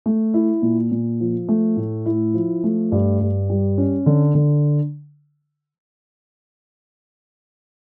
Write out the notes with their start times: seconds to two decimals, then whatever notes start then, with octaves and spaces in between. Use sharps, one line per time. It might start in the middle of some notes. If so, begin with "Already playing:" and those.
0.06 A3
0.34 E4
0.62 A#2
0.92 A#2
1.20 F3
1.49 A3
1.77 A2
2.06 E4
2.34 F3
2.64 A3
2.92 G2
3.20 G2
3.50 G3
3.78 C#4
4.06 D3
4.35 D3